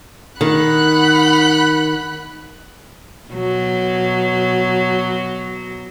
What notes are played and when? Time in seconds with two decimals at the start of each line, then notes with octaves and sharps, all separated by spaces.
0.41 D#3 F#5 B5 F#6
3.30 B2 F#3